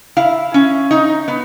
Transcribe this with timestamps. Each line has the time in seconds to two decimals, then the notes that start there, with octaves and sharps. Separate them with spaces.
0.17 E4 F5
0.54 C#4
0.91 D#4
1.28 B3